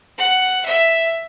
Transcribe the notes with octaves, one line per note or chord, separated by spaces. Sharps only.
F#5
E5